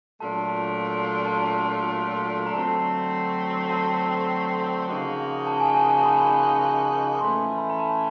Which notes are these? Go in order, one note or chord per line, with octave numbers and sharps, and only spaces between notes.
A#2 F#3 A3 D4 F4 A5
A5
A#5
A#5
D3 F#3 A3 C4 A5
A5
C#3 F3 A#3 D#4 F#4
A5
G#5
G#5
A5
B5
A2 E3 A3 C#4 C6
B5
A#5
A5